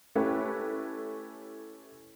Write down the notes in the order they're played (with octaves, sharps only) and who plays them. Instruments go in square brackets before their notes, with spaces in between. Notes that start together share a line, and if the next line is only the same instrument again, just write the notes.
[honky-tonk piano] A3 C#4 E4 G4 B4